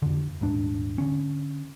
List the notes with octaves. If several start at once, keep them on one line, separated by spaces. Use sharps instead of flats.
F2 D3
D#1 G#2 D4
D3 C#4